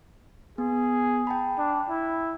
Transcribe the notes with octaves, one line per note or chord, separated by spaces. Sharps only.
B3 G#4
G5 A5 B5
D4
E4